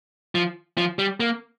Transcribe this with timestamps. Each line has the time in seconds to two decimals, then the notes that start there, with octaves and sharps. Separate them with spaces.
0.35 F3
0.78 F3
0.99 G3
1.20 A#3